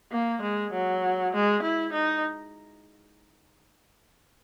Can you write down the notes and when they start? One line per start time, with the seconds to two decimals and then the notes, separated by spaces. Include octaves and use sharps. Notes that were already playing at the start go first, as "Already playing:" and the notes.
0.11 A#3
0.42 G#3
0.73 F#3
1.33 G#3
1.62 E4
1.93 D#4